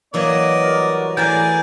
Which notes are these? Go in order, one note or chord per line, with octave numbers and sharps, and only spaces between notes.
E3 F#3 A#3 D5 D#5
G3 F#4 A#4
A2 E3 G#4 A#4 D5 G#5 G6